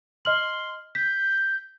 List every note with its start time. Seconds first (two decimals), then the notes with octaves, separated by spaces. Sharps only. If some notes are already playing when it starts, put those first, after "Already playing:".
0.25 D#5 C6 F6 F#7
0.95 G6 B6